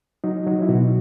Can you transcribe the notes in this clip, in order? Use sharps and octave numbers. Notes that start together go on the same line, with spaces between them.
F#3 D#4
F#3
E4
B2 F#4